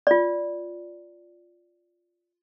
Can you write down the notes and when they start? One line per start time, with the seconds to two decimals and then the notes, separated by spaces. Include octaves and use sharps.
0.07 F4 D5